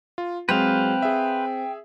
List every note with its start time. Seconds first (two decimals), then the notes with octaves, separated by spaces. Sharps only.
0.18 F4
0.49 F#3 G#3 C4 B4 C5 F5 G5
1.02 G#4 E5